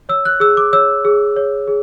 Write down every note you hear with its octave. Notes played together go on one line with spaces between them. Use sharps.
C#5 E6
F#6
G#4 E6
D6
C#5 E6
G#4
C#5
G#4